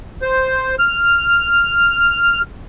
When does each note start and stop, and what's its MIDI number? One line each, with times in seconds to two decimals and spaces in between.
0.22 0.75 72
0.79 2.41 89